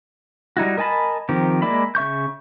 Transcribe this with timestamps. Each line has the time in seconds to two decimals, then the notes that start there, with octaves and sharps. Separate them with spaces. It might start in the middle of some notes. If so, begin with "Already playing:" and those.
0.57 G3 D#4 E4 F#4
0.78 A#4 D#5 G#5 A5 B5
1.29 D#3 F3 C4 G4
1.62 G#3 A#3 D5 E5 B5
1.95 C#3 E5 C#6 G6